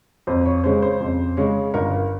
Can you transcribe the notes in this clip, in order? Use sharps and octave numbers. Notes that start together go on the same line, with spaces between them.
F2 C5
C#5
C#3 G#3 C#4 C5
C5
F2
C#3 G#3 C#4
G1 A#4